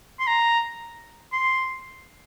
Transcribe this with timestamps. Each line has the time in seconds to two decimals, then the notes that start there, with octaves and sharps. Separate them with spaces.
0.19 C6
0.27 A#5
1.33 C6